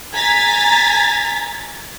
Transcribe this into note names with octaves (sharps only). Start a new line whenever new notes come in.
G#5 A#5 G#6 A6 B6